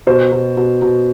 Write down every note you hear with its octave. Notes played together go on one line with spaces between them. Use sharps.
B2 C5
B2
B2
B2